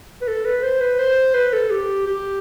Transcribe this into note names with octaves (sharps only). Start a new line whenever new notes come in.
B4
A4
B4
C5
B4
C5
B4
A4
G4
G4